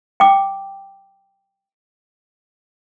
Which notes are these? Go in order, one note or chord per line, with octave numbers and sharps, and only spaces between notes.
G5 D6